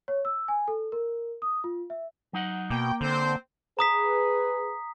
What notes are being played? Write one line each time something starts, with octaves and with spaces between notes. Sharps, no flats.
C#5
E6
G#5
A4
A#4
D#6
F4
E5
F#3 D#4 F#5
B2 A#3 G5
D3 C4 C5
G#4 B4 A#5 D#6 B6